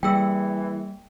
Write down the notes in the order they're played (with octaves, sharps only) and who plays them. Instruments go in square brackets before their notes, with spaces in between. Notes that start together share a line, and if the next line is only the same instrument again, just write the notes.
[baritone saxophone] E3 [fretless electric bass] G3 [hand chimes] A#3 G#4 [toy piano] G5 E6